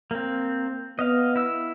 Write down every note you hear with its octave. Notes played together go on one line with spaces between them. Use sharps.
A#3 C4
B3 D#5 F5
E4 E6